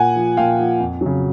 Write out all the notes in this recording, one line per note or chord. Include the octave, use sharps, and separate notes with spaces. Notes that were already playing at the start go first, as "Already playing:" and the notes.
Already playing: A#2 F#5 G#5
F3
A#2 F5 G5
F3
F2
F#3
C#3